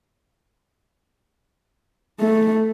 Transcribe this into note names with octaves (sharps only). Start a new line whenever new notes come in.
A3